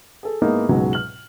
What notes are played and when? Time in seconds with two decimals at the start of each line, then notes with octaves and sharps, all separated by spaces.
0.23 G#4 A4
0.42 G#2 G#3 A#3 B3 D#4 E4
0.69 C#2 G#2 B2 F#3 G#3
0.93 F6 F#7